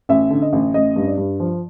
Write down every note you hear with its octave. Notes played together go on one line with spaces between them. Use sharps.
A1 E5
D3
D#5
A1
A1 D#5
G2
D5
G2
F3